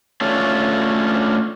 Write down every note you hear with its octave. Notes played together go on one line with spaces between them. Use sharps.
A3 C#4 D4 F4